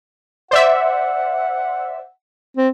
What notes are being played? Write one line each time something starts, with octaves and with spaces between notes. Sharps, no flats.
C5 D5 E5 F#5
C4